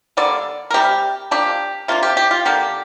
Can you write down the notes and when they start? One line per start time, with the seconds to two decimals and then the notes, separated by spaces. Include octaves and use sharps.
0.17 D3 G3 A#3 D5
0.70 A#4
0.74 C3 G3 D4 G4
1.31 F3 A#3 D4 G4
1.88 C3 A#3 D4 F4
2.03 G4
2.17 G4
2.31 F4
2.45 D3 A#3 D4 G4